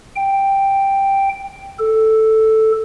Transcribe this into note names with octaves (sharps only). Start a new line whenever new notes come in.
G5
A4